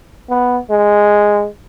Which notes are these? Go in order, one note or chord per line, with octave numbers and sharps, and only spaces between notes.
B3
G#3